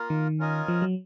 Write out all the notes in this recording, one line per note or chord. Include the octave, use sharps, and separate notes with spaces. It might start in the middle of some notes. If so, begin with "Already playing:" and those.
Already playing: A#3 F4 A#4
D#3
C#4 F4 A#4 D#5 G#5
F3
F#3